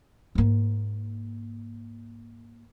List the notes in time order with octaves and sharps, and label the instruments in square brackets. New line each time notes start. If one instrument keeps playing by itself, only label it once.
[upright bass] G#2 A#3